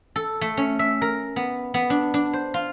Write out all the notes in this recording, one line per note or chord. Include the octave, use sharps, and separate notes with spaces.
A4
A3
C#4
E5
A#4
B3
B3
D4
D4
C5
F4